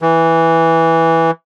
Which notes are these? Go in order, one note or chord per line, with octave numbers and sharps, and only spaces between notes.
E3